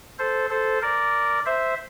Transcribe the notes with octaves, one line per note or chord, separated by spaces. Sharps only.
A4 C5
A4 C5
A#4 D5
C5 E5